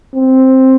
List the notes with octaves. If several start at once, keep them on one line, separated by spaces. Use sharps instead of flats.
C4